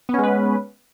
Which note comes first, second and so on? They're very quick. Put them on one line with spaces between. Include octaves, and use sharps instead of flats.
B3 C#4 G#3 B4